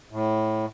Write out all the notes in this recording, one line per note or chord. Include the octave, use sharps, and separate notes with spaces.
A2